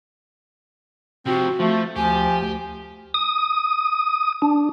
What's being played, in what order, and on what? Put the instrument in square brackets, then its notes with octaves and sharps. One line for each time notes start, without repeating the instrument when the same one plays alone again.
[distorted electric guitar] C3 F3 [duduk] C4 [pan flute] F#4
[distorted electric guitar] F3 [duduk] A3
[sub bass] D2 [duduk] F3 [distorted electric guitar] G4 [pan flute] G#5
[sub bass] D2
[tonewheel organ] D#6
D4